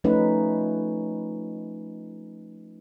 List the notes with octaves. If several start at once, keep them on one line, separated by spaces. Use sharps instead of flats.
F3 A3 C#4 D#4 B4